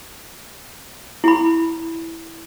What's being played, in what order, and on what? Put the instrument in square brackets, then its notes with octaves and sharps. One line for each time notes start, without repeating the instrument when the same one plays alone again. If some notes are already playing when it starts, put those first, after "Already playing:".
[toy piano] E4 B5